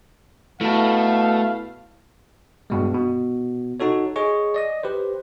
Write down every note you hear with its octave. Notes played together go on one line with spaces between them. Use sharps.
B2 A3 E4 F5 A5
G2 B2 G#3
B2
D#4 F#4 A4 C#5
G#4 C#5 D#5 C#6
D5 D#5 D#6
G4 B4 C5